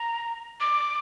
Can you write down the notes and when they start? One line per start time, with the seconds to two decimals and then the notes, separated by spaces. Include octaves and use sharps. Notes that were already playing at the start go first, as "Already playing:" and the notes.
Already playing: A#5
0.60 D6